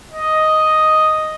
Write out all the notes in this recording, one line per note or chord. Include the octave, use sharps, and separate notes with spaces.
D#5